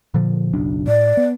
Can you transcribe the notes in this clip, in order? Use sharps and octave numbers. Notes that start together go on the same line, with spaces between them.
A#2 D3 F3
F#1 B1 D4
A2 D5
B3